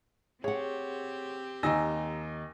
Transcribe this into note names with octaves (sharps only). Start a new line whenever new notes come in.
C4 G4 G#4 C#5 F#5
D#2 D#4 G#5 A#5 E6 A#6